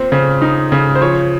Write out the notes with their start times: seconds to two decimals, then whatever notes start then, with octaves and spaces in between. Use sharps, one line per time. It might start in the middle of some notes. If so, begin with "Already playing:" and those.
Already playing: A#2 C4
0.12 C#3
0.42 D#4
0.72 C#3
0.95 C5
1.02 F3 C#5